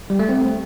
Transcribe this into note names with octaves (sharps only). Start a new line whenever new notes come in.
G3
A3
C4